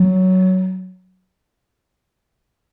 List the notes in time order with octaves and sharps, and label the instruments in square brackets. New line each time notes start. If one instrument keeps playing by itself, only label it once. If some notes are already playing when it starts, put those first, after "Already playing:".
Already playing: [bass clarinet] F#3